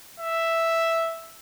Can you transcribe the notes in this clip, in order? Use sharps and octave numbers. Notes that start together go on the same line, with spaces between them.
E5